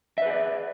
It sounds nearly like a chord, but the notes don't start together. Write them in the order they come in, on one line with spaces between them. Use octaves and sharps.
E5 B4 G#4 D5